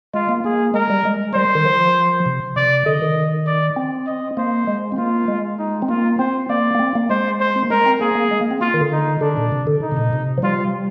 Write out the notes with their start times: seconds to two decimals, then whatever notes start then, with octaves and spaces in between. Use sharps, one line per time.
0.14 G#3 F4
0.29 A#3
0.44 A#3 G#4
0.74 G#3 A#4
0.90 G3
1.05 G#3
1.34 G3 C5
1.55 D#3
1.65 F3
2.26 C3
2.56 C3 D5
2.86 D3 D#5
3.02 D#3
3.47 D5
3.76 C4
4.07 D#5
4.37 A#3 C5
4.67 G#3
4.92 C4
4.97 A#3 F4
5.28 G#3
5.59 D#4
5.82 C4
5.89 A#3 F4
6.19 C4 C5
6.50 A#3 D5
6.75 A#3
6.79 C4
6.95 A#3
7.10 G#3 C5
7.40 C5
7.56 C4
7.62 A#3
7.70 G#3 A#4
7.86 C4
8.01 A#3 G#4
8.15 A#3
8.31 G#3
8.41 A#3
8.51 C4
8.61 A#3 F4
8.74 D#3
8.81 D3
8.92 D#4
9.21 D3 D4
9.37 A#2
9.52 C3
9.67 D3
9.82 D#4
9.92 C3
9.97 A#2
10.13 C3
10.38 F3
10.42 G3 F4